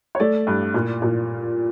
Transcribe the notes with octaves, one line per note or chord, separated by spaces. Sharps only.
C#5
A3 D5
G2
A#2
A#2